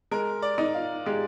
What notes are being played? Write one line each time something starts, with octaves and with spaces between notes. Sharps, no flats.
G#3 A#4
D5
D#4
F4
G#3 G4